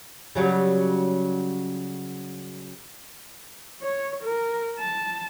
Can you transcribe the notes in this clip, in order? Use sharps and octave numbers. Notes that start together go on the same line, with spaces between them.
C#3 F#3 G3
C#5
A#4
A5